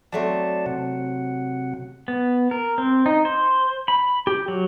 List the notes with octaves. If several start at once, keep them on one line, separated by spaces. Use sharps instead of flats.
F#3 A3 C4 D5 A5
C3 F#5
B3
A#4
C4
D#4
C5
B5
G4
F#3